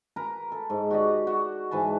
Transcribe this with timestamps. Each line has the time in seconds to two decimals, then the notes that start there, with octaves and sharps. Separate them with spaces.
0.16 A#4 B4 A#5
0.52 A4
0.70 G#2
0.91 F#4 G4 D5 D#5
1.27 F#4 F#5
1.71 G#2 E3 B4 A5